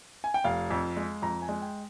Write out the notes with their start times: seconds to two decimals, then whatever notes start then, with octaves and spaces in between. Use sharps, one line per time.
0.24 G#5
0.34 G5
0.44 F1 F5
0.70 F2
0.97 G#3
1.22 F2 A#5
1.42 G#5
1.49 G#3
1.62 G5